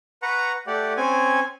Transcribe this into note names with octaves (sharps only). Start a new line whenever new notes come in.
B4 F#5 A#5 C#6
A3 G4 D5 F#5
C4 C#4 G#5